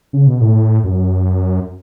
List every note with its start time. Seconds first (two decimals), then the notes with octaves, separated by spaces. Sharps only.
0.13 C#3
0.27 B2
0.41 A2
0.84 F#2